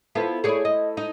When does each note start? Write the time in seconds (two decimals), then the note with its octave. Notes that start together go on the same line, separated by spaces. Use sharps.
0.15 B3 E4 F4 A4 C5
0.44 A3 E4 G#4 C#5 D5
0.65 D#5
0.97 D#4